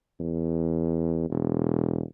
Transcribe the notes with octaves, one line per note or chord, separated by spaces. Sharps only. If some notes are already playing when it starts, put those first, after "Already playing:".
E2
E1